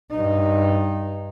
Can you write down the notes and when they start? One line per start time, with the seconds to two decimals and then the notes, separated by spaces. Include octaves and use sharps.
0.10 G2 D#4